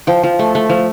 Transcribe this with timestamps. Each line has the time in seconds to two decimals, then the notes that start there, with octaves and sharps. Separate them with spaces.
0.07 F3 G5
0.23 F3
0.39 A3
0.55 A3
0.70 F3